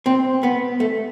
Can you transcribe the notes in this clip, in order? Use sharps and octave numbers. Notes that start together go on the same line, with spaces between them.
C4
B3
A3